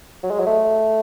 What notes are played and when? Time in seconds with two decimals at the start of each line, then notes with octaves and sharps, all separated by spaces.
0.23 F#3
0.31 G#3
0.40 F#3
0.46 A3